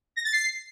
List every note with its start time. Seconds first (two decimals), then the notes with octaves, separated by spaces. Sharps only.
0.16 A#6
0.24 A6
0.32 C7